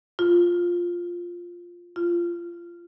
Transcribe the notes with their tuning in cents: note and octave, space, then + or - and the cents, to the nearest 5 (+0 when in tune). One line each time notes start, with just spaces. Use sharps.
F4 +5
F4 -20